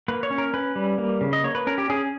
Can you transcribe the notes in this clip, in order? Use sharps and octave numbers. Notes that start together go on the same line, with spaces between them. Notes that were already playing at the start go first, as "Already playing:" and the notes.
A#3 B4
C#5
C#4
A#4
C#4 B4
G3
A#3
C#3
D#5
A#3 C#5
B4
C#4 A#4
G4
C#4 G#4